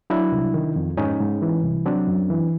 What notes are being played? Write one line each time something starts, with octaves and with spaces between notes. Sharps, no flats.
F#3 D4 E4
C2
D#3
F2
G#2 C#4 D#4
G#2
E3
C2
F#3 C4 D4
F#2
E3